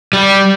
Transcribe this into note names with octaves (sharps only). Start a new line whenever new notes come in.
G3